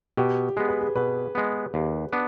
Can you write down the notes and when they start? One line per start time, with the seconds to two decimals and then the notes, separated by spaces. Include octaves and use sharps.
0.17 B2 G4
0.56 G#3 B3 G#4
0.68 B4
0.81 G#4
0.95 B2 B4
1.35 G#3 B3
1.74 D#2
2.12 B3 D4